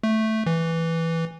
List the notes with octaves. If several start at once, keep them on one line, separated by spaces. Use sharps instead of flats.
A3
E3